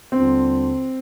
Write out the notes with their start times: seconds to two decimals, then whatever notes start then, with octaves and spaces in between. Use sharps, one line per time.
0.12 D#2 D3 G3 C4 D4 F4